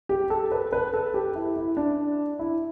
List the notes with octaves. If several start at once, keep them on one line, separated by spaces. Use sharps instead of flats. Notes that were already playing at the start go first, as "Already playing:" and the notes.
G4
A4
B4
B4
A4
G4
E4
E4
D4
E4